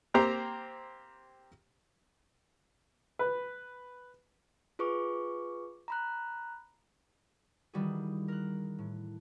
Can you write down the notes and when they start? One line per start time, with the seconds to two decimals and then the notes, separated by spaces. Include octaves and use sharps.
0.14 A#3 C4 G4 C5 A#5
3.19 B4
4.79 F4 G#4 B4 C#6 D6
5.88 A#5 B5 F#6
7.74 D#3 E3 G3 F#4 G#4
8.28 A#4 F#6
8.79 A2